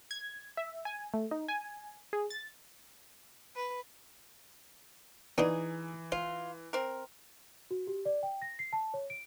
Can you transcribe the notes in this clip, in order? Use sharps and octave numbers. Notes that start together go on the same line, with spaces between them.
G#6
E5
G#5
A3
D#4
G#5
G#4
A6
B4
E3 B3 D4 D#4 G#4 C5
F4 C5
C4 A#4
F#4
G4
D5
G5
A#6
C7
A5
C#5
D7